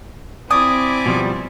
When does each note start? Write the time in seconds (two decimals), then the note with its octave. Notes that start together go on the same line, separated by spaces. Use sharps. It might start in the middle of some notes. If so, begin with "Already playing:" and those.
0.51 C4 E4 D5 G#5 D6 D#6
1.06 B2 F3 G3